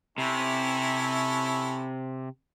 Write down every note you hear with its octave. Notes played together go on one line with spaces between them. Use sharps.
C3 C#4 E4 A4